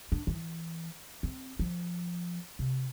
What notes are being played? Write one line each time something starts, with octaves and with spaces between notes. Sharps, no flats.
D4
E3
C4
F3
C3